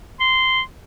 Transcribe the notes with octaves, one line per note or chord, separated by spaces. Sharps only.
C6